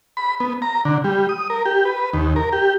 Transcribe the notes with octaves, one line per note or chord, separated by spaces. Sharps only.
B5
B3
A#5
D3
G3
D#6
A#4
G4
B4
D#2
A#4
G4